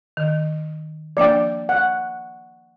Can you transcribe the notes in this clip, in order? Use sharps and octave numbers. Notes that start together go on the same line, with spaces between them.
D#3
F3 A#3 D4 D5 G5
F#5